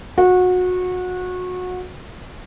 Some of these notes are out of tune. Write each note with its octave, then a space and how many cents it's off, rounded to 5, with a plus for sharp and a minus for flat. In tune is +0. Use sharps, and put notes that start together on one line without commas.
F#4 -25